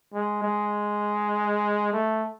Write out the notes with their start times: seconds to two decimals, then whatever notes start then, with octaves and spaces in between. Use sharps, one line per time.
0.14 G#3
0.42 G#3
1.92 A3